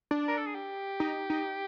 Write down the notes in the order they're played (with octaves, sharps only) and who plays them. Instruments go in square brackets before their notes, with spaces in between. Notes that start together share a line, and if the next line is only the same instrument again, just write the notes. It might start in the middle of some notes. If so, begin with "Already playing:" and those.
[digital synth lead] D4
[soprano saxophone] A#4
A4
G#4
G4
[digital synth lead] D#4
D#4